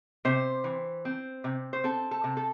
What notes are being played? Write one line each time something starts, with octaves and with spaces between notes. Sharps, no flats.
C3 C5
E3
C4
C3
C5
C4 A4
A4
C3
A4